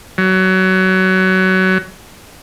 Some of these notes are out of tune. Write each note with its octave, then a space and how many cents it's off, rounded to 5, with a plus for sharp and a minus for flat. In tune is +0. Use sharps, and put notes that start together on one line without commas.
F#3 +20